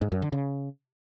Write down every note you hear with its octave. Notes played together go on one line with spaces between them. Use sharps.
G#2
F#2
D3
C#3